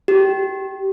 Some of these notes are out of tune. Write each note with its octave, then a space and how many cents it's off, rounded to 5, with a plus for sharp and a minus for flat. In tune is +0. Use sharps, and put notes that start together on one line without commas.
G4 -20